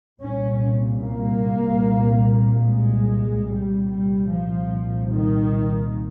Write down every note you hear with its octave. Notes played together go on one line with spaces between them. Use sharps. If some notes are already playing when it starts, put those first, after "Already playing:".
C2 A#2 C#4
A#3
G#3
C2 A#2 G3
G3
F3
D#3